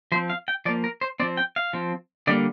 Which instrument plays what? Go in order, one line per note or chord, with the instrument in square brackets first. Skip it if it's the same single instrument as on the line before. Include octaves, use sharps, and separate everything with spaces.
[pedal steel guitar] F3 C5
C4
F5
G5
F3 A#3 D5
A#4
C5
F3 C4 D5
G5
F5
F3 C4
D3 G3 A#3 D5